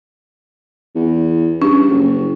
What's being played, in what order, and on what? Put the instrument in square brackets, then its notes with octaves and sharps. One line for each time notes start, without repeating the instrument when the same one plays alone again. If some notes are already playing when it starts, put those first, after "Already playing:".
[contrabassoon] E2
[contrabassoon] G2 [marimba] C#4
[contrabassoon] F#1